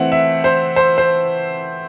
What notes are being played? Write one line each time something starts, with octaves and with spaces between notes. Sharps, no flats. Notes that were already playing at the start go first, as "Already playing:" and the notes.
Already playing: E3 A3 C4 F#5
E5
C5
C5
C5